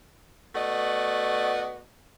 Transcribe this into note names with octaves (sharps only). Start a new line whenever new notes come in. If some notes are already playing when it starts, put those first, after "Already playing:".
A3 B3 F#4 D5 D#5